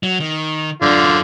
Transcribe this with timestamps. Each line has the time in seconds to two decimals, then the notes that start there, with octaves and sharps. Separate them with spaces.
0.03 F#3
0.20 D#3
0.82 F#2 D3 D4 F4